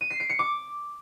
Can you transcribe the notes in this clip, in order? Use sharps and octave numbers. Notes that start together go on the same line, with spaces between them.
D#7
C7
D7
C#7
D6